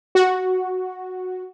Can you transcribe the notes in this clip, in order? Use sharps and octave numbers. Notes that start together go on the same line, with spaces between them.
F#4